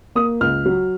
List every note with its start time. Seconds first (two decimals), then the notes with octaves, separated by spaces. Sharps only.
0.15 A#3 D#6
0.41 C#2 F6
0.66 F#3